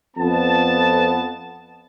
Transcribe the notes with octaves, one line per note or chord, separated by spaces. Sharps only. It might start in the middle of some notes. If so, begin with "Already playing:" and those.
F2 B3 A5